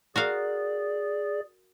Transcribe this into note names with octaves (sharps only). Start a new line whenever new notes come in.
F#4 G#4 A#4 D5 F5